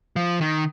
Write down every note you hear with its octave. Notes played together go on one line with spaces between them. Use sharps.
F3
D#3